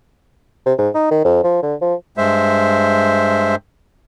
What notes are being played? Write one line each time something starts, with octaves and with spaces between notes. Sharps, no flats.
C3
G#2
D#4
D#3
F2
F3
D3
F3
G2 G#3 C5 E5